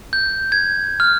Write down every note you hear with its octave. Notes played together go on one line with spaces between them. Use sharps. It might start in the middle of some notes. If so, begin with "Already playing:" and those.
G6
G#6
F6